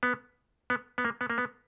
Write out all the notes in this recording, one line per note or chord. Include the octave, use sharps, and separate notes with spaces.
B3
B3
B3
A#3
B3
A#3
B3